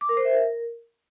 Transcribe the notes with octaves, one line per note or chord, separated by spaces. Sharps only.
D6
A#4
C5
E5
A#4